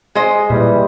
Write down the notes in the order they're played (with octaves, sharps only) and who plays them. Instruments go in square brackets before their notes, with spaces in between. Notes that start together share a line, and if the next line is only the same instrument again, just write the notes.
[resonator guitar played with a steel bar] G#3 C5 D#5
[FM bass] A#2 [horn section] E3 G3